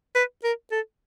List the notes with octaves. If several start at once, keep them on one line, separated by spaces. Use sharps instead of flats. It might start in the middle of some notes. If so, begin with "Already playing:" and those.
B4
A#4
A4